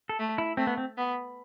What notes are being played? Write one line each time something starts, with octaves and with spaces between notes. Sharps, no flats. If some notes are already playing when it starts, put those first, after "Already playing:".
A4
A3
E4
A3 C4
B3
C4
B3